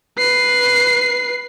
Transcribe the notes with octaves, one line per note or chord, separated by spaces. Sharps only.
B4 C7